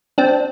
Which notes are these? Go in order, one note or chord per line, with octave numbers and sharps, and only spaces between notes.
C4 D4